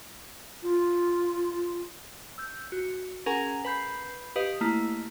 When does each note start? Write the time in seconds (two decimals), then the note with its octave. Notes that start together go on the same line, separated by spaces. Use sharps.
0.63 F4
2.38 E6 G6
2.72 F#4
3.26 C#4 G#4 A#4 F#5 G#5 A#5
3.65 B4 B5 G6 C7
4.36 G4 B4 D#5 F5 D#6
4.61 A3 A#3 E4